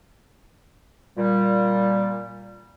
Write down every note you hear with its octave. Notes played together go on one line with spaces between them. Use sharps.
A#2 G3